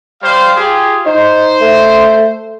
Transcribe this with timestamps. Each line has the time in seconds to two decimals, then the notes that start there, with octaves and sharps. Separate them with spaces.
0.23 G3 C5 F5
0.56 F4 G4 G#4
1.06 D#4 C5
1.61 A3